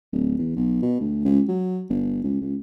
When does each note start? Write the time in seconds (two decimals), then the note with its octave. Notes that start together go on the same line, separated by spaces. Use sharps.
0.12 D1
0.39 E2
0.56 B1
0.82 B2
1.00 D2
1.25 C#2
1.49 F#3
1.89 G1
2.24 C#2
2.41 C#2